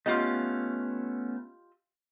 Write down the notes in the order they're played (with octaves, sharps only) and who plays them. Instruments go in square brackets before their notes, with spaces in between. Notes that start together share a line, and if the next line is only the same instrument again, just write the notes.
[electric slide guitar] A3 B3 C#4 [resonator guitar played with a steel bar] F4 G4 D#5